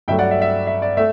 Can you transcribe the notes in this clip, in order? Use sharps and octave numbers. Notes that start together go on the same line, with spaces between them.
G2 F#3 A3 E5 G5
D5 F#5
E5
E5
E5
D5
A3 E5